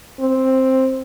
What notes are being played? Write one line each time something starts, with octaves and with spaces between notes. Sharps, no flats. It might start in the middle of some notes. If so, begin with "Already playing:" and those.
C4